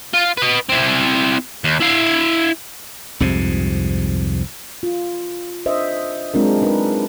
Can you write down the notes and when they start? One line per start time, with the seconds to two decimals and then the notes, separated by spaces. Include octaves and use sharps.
0.13 F4
0.37 B4 D#5
0.69 C4 E4
1.64 D#2
1.81 E4 F5
3.20 C2 F2 G#2 C3
4.83 F4
5.66 D4 C5 D#5 E5
6.34 F#3 G#3 C4 D4 F4 A#4
6.62 D4 D#4 A#4 B4